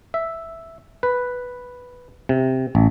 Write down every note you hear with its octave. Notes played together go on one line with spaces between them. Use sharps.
E5
B4
C3
A1